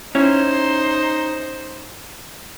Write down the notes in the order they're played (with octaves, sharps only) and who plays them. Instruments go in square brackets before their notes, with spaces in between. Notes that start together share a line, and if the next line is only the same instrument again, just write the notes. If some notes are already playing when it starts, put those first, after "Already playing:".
[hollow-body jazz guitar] C#4 E4 C#5 [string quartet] D#4 C5